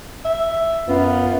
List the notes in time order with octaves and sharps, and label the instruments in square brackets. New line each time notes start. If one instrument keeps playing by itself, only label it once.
[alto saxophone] E5
[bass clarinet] F#2 [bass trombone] B3 [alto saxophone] F4